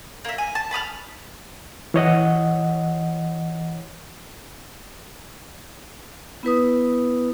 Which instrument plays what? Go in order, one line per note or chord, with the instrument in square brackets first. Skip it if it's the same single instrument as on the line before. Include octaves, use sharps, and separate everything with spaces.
[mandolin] A#3 E5
G#5
A5
A5 B5 D#6 F6
[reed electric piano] E3 C#5 D#5 F#5
[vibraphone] B3 E4 B4 D#6